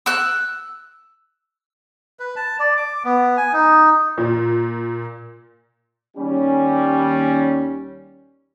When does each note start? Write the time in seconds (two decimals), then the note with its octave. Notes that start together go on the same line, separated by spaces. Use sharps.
0.06 E6 F#6
2.19 B4
2.36 A5
2.59 D5
2.77 D6
3.04 B3
3.37 G#5
3.53 D#4
4.18 A#2
6.17 D#2 G3 C#4